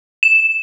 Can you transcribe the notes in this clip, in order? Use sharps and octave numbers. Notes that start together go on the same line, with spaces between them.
E7